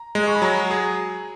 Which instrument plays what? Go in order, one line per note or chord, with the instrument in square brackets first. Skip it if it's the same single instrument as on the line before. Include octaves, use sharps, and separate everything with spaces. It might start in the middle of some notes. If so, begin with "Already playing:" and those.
Already playing: [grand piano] A#5
[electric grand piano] G#3
[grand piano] C#6
B5
[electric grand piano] F#3 [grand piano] A#5
[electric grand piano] G#4